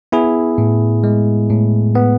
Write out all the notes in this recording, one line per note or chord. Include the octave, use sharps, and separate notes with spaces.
B3 E4 G#4
A2
G#3
A2
B3